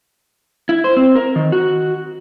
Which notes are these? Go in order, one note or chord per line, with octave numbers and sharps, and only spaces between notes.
E4
C5
C4
A#4
D#3
F#4